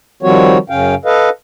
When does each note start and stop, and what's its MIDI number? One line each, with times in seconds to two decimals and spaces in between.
0.23 0.58 51
0.23 0.58 53
0.23 0.58 55
0.23 0.58 60
0.23 0.58 66
0.23 0.58 73
0.70 0.95 42
0.70 0.95 49
0.70 0.95 61
0.70 0.95 77
0.70 0.95 79
1.05 1.29 69
1.05 1.29 71
1.05 1.29 75
1.05 1.29 77